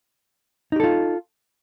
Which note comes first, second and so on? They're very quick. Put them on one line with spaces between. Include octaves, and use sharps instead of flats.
D#4 G4 A4 F4